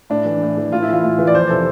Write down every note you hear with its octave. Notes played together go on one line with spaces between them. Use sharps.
A2 D4
E3
A2
E3
A2 F4
E4
E3 F4
A2
E3
D5
F2 C5
C3 E3 A4